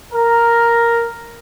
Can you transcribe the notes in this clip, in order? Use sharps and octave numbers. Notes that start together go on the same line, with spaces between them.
A#4